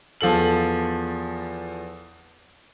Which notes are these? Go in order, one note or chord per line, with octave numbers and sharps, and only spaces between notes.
E2 F3 A4 F#7